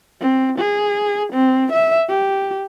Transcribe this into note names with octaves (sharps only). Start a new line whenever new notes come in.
C4
G#4
C4
E5
G4